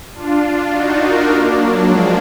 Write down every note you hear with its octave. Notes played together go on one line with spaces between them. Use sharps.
D4 F4
D#4 F#4
F#4 A#4
A#3 D4
F#3 A#3
F3 G#3